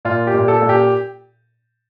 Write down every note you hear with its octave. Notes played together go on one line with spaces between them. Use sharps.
A#2 F4
G4
A#2
A4
A#2
G4